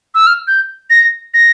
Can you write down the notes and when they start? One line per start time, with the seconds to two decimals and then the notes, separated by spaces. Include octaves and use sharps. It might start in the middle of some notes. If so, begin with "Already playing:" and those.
0.15 E6
0.27 F6
0.48 G6
0.90 A#6
1.34 A#6